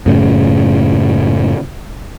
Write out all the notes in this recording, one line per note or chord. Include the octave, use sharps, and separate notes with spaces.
F#2 A2 C#3